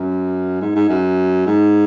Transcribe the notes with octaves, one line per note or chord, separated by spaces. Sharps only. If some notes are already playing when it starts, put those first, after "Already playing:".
Already playing: F#2
G#2
G#2
F#2
G#2